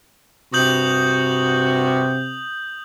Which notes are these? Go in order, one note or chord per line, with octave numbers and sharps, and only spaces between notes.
G2 C3 F#4 D#6 G6 F#7